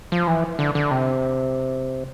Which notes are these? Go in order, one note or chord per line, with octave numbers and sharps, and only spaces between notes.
F3
E3
D3
D3
C3